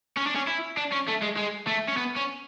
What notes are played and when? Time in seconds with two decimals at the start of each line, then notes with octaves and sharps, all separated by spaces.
0.17 C#4
0.27 D4
0.35 C#4
0.48 E4
0.77 D4
0.92 C#4
1.08 A3
1.22 G#3
1.36 G#3
1.67 A3
1.88 C#4
1.97 B3
2.16 C#4